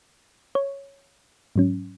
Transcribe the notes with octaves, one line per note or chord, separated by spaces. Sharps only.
C#5
G#2 F#3 C#4